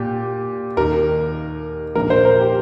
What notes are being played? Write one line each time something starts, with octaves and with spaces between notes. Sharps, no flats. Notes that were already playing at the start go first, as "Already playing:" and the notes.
Already playing: A#2 G4
D#2 D#3 A#4
A#1 A#2 A#4
C5
A#4
G4